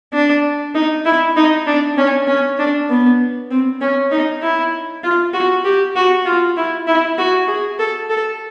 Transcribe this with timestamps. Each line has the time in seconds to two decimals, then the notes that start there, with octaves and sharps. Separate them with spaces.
0.13 D4
0.75 D#4
1.06 E4
1.36 D#4
1.67 D4
1.98 C#4
2.27 C#4
2.59 D4
2.89 B3
3.50 C4
3.81 C#4
4.11 D#4
4.42 E4
5.03 F4
5.33 F#4
5.65 G4
5.96 F#4
6.25 F4
6.57 E4
6.87 E4
7.18 F#4
7.48 G#4
7.79 A4
8.10 A4